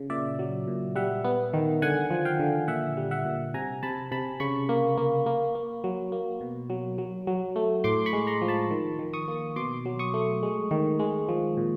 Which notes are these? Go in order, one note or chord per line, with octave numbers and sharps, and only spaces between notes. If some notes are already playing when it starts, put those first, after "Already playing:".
Already playing: C#3
A#2 D5 E5
F#3
A#2
G3 E5 F#5
B3
D#3
D3 F#5 G#5
F3
F5 G5
D3
A#2 E5 F#5
G3
E5 F#5
A#2
C3 G#5 A#5
C3 A5 B5
C3 A5 B5
C#3 B5 C#6
A#3
A#3
A#3
A#3
F#3
A#3
B2
F#3
F#3
F#3
A3
A2 C6 D6
B5 C#6
G#3
A#5 C6
F3
A5 B5
D#3
D#3
C#6 D#6
A#3
B2 C6 D6
F#3
C#6 D#6
A3
G#3
D#3
G#3
F3
A#2